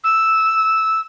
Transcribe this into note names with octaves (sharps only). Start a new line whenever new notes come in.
E6